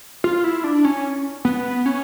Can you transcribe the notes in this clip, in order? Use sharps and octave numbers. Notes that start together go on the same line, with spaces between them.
F4
E4
D4
C#4
B3
C#4